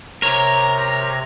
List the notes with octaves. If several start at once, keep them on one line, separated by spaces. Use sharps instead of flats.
C3 A#4 C#5 A#5